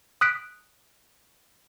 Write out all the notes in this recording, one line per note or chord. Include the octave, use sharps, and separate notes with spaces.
D#6 F#6 B6 D7